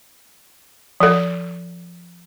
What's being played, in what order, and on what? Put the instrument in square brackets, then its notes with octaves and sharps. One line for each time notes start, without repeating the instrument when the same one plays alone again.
[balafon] F3 A4